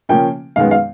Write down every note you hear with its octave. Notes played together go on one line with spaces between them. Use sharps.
C#3 F3 A#3 C#4 G5
F#2 D#3 G#3 B3 F5
F5